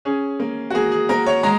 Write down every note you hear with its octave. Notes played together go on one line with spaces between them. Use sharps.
C#4 G#4
A#3
F#4
A#3 G#4
G#4
A#3 A#4
C#5
G#3 A#5